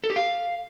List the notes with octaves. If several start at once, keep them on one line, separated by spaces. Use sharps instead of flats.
A4
G4
F5